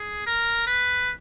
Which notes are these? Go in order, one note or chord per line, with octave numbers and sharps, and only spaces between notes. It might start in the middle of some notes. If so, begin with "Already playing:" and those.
Already playing: G#4
A#4
B4